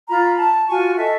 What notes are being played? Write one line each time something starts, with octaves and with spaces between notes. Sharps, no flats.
F4 A#5 B5
A5
F4 F#4 G#5 C#6
A4 D#5 E5 C#6